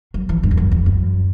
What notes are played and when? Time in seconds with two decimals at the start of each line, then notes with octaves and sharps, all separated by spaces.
0.14 F#3
0.29 E3
0.43 G2
0.51 E2
0.57 F#2
0.72 E2
0.86 F#2